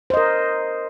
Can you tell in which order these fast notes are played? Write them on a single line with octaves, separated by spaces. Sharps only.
C5 D#5 A#4